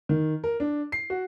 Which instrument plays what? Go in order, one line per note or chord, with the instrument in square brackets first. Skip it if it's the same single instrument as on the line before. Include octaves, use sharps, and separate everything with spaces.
[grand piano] D#3
A#4
D4
C7
F#4